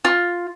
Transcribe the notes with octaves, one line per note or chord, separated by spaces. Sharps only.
F4